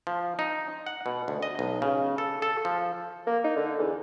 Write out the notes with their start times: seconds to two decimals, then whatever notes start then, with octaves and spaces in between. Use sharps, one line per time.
0.07 F3
0.39 D#4
0.86 F#5
1.06 B2
1.28 D2
1.43 D#5
1.59 B1
1.82 C#3
2.18 A4
2.42 A4
2.65 F3
3.27 A#3
3.44 D#4
3.56 D3
3.79 E2